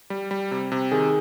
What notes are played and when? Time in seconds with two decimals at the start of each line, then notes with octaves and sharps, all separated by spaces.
0.10 G3
0.31 G3
0.51 C3
0.72 C3
0.92 D#3 G#4